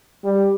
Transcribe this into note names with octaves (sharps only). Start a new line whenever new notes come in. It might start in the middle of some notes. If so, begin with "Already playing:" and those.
G3